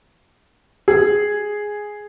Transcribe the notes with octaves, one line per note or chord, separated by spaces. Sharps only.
G#4